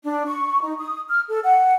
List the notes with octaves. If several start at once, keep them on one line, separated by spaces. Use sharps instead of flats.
D4
C#6
D#4
D#6
F6
A4
F#5